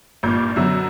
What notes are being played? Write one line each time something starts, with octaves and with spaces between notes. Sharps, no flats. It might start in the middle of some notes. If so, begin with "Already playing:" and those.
G#1 G2 A#2 C#6 G6
F#2 B2 D3 F#3